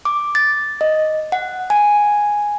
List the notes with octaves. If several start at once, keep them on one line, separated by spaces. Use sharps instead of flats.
D6
A6
D#5
F#5
G#5